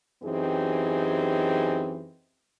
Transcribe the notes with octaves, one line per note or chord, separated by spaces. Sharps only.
F#2 E3 C4 D#4 G4 G#4